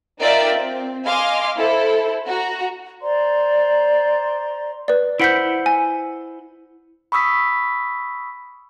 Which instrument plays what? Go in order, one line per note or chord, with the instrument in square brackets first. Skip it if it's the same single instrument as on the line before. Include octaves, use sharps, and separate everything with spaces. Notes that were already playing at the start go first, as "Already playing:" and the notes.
[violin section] D#4 F4 A#4 D5 E5 G5
C4
D#5 F5 G#5 C6 D6 F6
E4 A4 C5
F#4 A#5
[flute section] C5 D5 A#5 C6
[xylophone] B4 D5
[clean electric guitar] E4 C5 F#5 [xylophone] G6 B6 D7
[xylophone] G#5
[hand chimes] B5 C#6 D#6 E6 B6